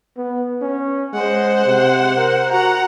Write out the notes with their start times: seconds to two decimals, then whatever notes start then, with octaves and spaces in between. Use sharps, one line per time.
0.17 B3
0.62 C#4
1.14 G#3 C5 F#5
1.66 C3
2.17 A#4
2.52 F#4 F#5 A#5